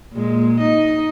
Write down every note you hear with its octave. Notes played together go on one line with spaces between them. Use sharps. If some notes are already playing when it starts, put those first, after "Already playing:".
A#2 G#3
D#4 D#5